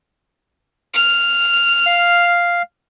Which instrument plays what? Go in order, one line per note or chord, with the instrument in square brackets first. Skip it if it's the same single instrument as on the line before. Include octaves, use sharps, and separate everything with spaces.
[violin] F6
[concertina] F5